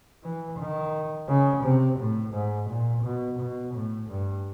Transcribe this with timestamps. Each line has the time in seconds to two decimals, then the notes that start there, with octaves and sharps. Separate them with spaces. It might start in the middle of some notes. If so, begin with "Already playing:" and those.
0.24 E3
0.59 D#3
1.28 C#3
1.64 C3
1.99 A2
2.33 G#2
2.70 A#2
3.04 B2
3.39 B2
3.74 A2
4.10 G2